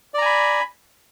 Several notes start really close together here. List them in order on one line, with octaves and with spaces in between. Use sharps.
D5 A#5 G#5 B5